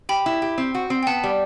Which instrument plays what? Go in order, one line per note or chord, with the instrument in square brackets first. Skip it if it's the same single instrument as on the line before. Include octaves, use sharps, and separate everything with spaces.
[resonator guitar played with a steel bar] G4 [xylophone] G5 B5
[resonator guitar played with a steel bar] E4
G4
C4
F#4
C4
[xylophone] G5
[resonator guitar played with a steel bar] B3 [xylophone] F#5 A5
[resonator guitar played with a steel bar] G3